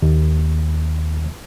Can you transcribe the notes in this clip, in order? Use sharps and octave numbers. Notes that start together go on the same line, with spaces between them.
D#2